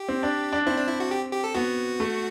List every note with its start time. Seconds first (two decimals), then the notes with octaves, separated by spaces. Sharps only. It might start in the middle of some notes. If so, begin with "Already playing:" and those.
Already playing: G4
0.09 C4
0.23 D4
0.53 D4
0.66 C4 E4
0.77 D4
0.88 E4
1.00 F#4
1.11 G4
1.32 G4
1.44 A4
1.55 B3 F#4
2.00 A3